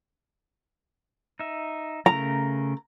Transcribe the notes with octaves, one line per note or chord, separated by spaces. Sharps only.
D#4 E5
C#3 A3 A#4 A#5